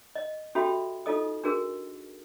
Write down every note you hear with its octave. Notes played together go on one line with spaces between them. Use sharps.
D#5
C#4 F#4 G4 A4 E5 B5
D#4 F4 A4 D#5 D#6
D4 F#4 G#4 A#4